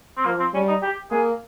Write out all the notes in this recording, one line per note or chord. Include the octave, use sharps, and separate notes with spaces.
C4
F3 A#3
C4
G3 C#4
D#4
G4
A#3 G#4